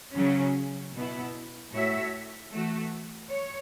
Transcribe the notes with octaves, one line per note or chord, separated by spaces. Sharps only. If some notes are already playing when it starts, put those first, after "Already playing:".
C#3 F#3 C#4
B2 B3 E4
A2 A3 F#4 C#5 E5
E3 A3 F#4
C#5